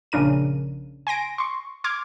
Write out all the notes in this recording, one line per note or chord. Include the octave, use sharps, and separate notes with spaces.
A#1 C#3 D4 A#4 D#7
G#5 C6 A#6 D7
C6 C#6
C6 D6 F6 G#6